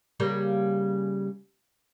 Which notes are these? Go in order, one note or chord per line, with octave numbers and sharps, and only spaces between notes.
C#3 G3 A#3